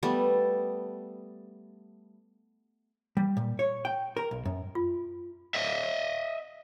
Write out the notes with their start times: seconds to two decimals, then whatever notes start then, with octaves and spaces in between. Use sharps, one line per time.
0.03 G3 A3 B3 A4
3.17 G3
3.37 A#2
3.59 C#5
3.85 G5
4.17 A#4
4.31 B1
4.45 F#2
4.75 F4
5.54 D#5 E5